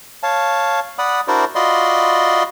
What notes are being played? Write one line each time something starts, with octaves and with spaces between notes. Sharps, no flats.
C#5 F5 A5
D5 F#5 B5 D#6
D4 E4 F#4 A#4 C5 D5
F4 F#4 D5 D#5 B5 C6